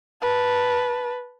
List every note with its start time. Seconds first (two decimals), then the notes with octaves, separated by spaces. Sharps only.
0.22 B4 A5